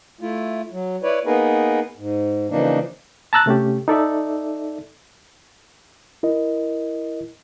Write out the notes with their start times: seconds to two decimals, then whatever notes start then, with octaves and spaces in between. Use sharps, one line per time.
0.21 A3 E4 F4
0.72 F#3
1.03 E4 B4 C#5 D5
1.26 A#3 B3 D#4 G#4 A#4 B4
1.97 G#2
2.50 C#3 E3 F3 A#3 D4 D#4
3.33 A5 A#5 E6 F#6 A6
3.46 C3 A3 C#4 G4
3.88 D#4 A4 D5 E5
6.23 E4 A#4 D#5